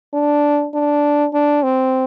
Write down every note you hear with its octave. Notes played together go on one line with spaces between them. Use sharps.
D4
D4
D4
C4